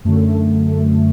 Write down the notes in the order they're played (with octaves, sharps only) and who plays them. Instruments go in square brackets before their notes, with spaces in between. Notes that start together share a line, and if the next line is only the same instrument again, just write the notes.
[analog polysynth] F#2 D3 A3